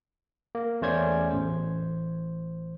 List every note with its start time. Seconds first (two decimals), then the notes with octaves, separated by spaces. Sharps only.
0.55 A#3
0.82 E2 A3 C#4 C5 D5 G#6
1.31 A1 C5